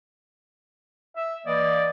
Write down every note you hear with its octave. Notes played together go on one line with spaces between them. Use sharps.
E5
E3 A#3 D5 D#5